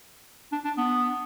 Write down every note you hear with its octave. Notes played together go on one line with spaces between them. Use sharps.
D4
D4
B3